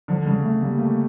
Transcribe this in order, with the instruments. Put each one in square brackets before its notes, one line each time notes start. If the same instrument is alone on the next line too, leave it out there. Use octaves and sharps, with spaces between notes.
[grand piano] D3 [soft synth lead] F3
[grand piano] C#3 [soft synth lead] G3
[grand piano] C#3 [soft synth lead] A3
[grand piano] G3 [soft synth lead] A#3
[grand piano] A3 [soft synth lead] A#3